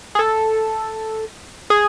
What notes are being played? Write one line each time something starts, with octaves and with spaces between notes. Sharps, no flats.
G#4
A4
G#4